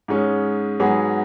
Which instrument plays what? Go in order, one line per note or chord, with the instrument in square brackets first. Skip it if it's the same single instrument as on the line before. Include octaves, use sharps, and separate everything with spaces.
[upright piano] G#2 G#3 C#4
G#2 F#3 B3 G#4